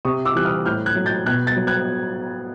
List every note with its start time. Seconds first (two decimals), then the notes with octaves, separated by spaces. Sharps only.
0.05 C3 C#6 D#6
0.25 D6 E6
0.35 E3 G3 F#6
0.45 D#6 F6
0.66 A2 F6 G6
0.86 F#6 G#6
0.96 F#3
1.06 G6 A6
1.26 B2 F#6 G#6
1.47 G6 A6
1.57 F#3
1.67 F#6 G#6